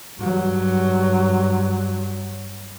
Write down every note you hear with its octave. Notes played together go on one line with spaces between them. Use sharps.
G2 F#3